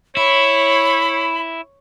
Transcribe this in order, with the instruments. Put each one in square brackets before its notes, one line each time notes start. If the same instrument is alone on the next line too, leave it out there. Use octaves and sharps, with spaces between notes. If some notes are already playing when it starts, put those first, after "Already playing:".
[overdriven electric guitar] E4 [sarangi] C#5 [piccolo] B5